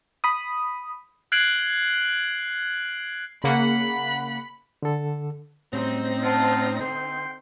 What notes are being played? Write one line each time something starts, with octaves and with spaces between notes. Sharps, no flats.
B5 D#6
F6 F#6 G#6 C7 D7 F#7
C#3 A#3 F#5 B5
D3 A4
A2 F#3 G3 C4 C#4 D#4 A#6
F4 F#5 A5
D3 G5 C6